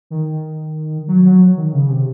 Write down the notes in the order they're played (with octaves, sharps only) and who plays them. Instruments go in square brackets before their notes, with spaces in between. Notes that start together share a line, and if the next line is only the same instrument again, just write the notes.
[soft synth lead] D#3
F#3
F#3
D#3
C#3
C3